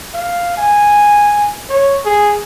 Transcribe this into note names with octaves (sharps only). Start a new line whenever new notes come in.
F5
G#5
C#5
G#4